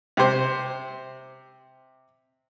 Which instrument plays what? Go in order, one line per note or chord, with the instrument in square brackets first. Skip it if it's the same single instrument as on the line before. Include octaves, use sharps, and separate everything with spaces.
[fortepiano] C3 C5